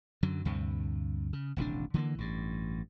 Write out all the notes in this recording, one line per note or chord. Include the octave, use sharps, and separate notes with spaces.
F#2 D3 F#3
D2 G2 C3
C#3
D#1 A1 C3 D4
D3 E3 A3 A#3
A1 G2